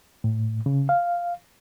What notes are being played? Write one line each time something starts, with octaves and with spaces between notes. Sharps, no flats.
A2
C#3
F5